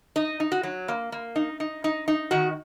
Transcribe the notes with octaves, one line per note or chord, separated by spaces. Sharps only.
D#4 D#5
D#4
F#4
F#3
A#3
A#3
D#4
D#4
D#4
D#4
D#3 F#4